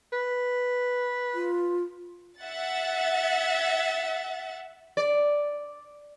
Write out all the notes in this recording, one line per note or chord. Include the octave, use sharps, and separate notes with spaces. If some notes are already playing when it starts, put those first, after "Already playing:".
B4
F4
E5 F#5 A6
D5